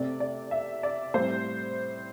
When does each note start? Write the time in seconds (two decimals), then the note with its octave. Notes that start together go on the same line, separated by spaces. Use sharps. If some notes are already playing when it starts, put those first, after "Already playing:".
Already playing: C3 A3 C4 D5
0.20 D5
0.51 E5
0.83 D5
1.14 A2 G3 C4 C5